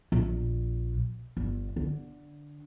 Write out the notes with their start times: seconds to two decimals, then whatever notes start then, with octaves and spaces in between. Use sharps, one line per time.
0.12 A#1
1.37 G1
1.76 D3